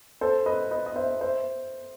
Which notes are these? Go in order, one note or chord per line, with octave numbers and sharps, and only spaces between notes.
A4 C5
B4 D#5
B4 D#5
D#5
C5 E5
C5 E5